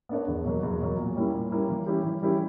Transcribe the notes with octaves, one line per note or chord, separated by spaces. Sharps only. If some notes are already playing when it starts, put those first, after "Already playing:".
B3 D4 A#4 C#5
E2
B2 F#3 A#3
E2
B2 F#3 A#3
A#2
G3 A#3 C#4 E4
A#2
G3 A#3 C#4 E4
E3
G3 C#4 E4 G4
E3
G3 C#4 E4 G4